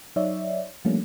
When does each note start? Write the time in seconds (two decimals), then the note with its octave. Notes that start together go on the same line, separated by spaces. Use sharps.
0.16 F#3 D#4 C#5 D5 E5
0.85 F3 G3 A3 A#3 C#4 D4